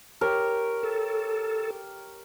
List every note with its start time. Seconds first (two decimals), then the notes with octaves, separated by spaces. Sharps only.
0.21 G4 A#4 C#5
0.83 A4